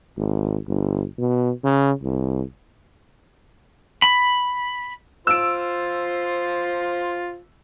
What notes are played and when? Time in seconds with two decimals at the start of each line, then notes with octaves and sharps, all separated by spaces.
0.17 G#1
0.68 G1
1.18 B2
1.64 C#3
2.03 C2
4.02 B5
5.27 F4 C5 E6 D7